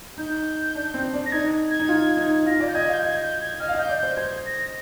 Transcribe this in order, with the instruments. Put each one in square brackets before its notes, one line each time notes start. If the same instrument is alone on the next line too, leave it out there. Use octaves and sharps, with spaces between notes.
[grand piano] D#4 [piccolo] G6
[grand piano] D4
C4
D4
[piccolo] A#6
[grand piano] D#4 [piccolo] G#6
[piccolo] G#6
[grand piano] D#4
F4
D#4
[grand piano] F4 [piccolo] A#6
[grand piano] D5
[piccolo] G6
[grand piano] D#5 [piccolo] G#6
[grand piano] F5 [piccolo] G6
[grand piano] D#5 [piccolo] G#6
[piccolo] G6
G#6
[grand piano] D#5 [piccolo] F6
[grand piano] F5
[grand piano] D#5 [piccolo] G6
[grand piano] D5
[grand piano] C5 [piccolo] G6
[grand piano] C5 [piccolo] G#6
[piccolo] A#6